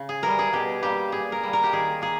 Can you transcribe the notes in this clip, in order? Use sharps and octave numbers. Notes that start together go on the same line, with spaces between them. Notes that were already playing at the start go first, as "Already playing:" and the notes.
Already playing: C#3
G#4
E3 G3 A#4
G#4
B2 G4
G3 A#3 G4
A#2 G#4
A#4
G3 A#3
A#4
G4
D#3 G#4
A#3 G#4